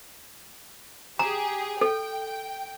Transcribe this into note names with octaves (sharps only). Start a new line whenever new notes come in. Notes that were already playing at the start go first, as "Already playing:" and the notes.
G4 G#4 A#5
A4 G5